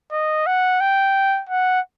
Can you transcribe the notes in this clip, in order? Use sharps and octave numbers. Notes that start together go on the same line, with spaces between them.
D#5
F#5
G5
F#5